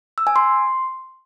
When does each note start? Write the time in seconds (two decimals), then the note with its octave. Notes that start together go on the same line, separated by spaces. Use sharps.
0.18 E6
0.27 G#5
0.36 C6